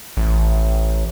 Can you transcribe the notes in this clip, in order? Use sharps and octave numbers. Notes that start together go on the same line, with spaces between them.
A1